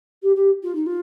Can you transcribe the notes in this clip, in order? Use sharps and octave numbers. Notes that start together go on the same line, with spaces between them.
G4
G4
F4
D#4
F4